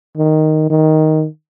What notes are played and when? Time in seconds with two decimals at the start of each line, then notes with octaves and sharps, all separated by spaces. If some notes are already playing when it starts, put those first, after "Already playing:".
0.17 D#3
0.70 D#3